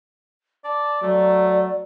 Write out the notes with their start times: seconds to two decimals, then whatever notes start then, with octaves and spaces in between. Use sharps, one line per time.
0.64 D5 A5
1.02 F#3 A3 D5